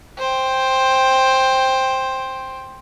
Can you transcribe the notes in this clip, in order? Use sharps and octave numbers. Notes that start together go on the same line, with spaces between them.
C5 G5